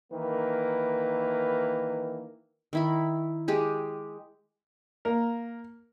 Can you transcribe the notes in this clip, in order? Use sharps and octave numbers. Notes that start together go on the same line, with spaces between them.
D#3 E3 A#3 A#4 B4
D#3 E4 B5
G#3 G4 G#4
A#3 A#4